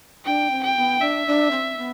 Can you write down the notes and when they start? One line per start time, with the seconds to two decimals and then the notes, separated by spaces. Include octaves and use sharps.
0.25 D4 G5
0.51 C4
0.63 G5
0.76 B3
1.01 D4 E5
1.27 D4
1.51 C4
1.77 B3